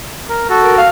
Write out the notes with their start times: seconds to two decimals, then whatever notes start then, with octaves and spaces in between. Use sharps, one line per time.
0.29 A#4
0.49 F#4 A4
0.63 A#4
0.78 F5